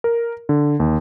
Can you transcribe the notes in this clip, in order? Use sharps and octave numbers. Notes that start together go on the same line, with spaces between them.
A#4
D3
D#2